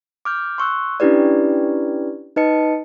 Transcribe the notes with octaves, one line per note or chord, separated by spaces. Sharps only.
D6 F6 G6
C6 C#6 E6 F#6
C#4 D4 E4 G4 B4 D5
D#4 B4 D#5 A5 C#7